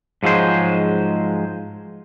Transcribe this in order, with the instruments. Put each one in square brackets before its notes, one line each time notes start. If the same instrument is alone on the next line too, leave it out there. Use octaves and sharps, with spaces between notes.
[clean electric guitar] G#2 F3 F#3 G#3 C5